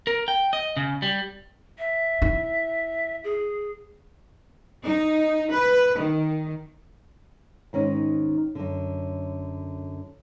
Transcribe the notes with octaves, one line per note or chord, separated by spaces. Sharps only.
A#4
G5
D#5
C#3
G3
E5
E4
G#4
D#4
B4
D#3
G#2 D#3 C#4 D#4
F#2 D3